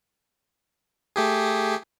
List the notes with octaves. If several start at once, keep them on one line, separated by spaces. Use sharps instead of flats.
A3 G4 G#4